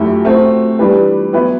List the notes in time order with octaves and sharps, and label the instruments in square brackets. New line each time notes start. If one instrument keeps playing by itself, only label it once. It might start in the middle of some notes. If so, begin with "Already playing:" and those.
Already playing: [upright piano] F#2 F#3 A3 E4 G4
A3 C4 F#4
E3 G3 D4 G4 B4
F#3 B3 E4 B4